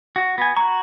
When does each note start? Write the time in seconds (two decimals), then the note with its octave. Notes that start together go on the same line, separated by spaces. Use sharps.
0.16 F#4
0.38 B3 G#5
0.57 F#4 A#5 C#6